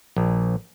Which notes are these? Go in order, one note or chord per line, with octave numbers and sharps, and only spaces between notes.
A#1